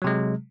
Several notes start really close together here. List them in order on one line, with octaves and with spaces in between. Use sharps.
F#3 C3 G#3